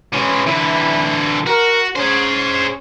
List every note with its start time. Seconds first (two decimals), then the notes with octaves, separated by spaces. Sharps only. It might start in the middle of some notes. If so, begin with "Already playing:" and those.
0.13 E3 G#3 C#4
0.47 D3 E3 E4
1.47 F#4 A#4
1.96 C#4 G#4 C5